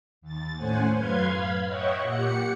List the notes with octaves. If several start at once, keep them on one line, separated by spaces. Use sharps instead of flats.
D#2 A6
A2 A3 C#4 C5 F#5 G#5
F#2 B4 F5 C6 G#6
F5 B5
C#5 D#5 E5 F#5 G5 C#6
A#2 G4 F#5 C#7